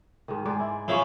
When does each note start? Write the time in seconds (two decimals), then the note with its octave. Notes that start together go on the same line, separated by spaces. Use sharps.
0.28 G#2 D#3
0.45 G#2 G#3 D5
0.60 E4
0.88 C#3 F3 C#4 E4 B5